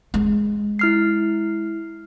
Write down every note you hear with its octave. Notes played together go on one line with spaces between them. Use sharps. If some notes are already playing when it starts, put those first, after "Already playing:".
G#3
E4 F6 C7